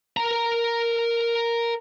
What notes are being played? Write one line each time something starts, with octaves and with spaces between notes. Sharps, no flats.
A#4 A#5